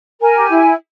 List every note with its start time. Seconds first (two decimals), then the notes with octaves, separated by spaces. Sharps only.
0.20 A#4 G#5
0.35 G4
0.50 E4